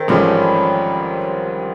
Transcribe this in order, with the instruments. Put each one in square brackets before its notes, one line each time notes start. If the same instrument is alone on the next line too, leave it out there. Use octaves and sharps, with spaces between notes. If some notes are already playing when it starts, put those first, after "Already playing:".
Already playing: [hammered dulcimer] D#3 C4
[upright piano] A1 G#2 F3 A3 C#4 [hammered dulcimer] G3